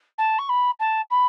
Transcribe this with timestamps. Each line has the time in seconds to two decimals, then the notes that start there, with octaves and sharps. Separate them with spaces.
0.18 A5
0.39 C#6
0.49 B5
0.80 A5
1.11 B5